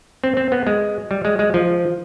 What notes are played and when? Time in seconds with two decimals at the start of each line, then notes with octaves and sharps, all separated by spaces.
0.24 C4
0.37 C4
0.52 B3
0.67 G#3
1.11 G3
1.25 G#3
1.39 G#3
1.54 F3